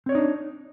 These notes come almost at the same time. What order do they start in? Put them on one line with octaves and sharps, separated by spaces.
C4 C#5 D5 D#4 D4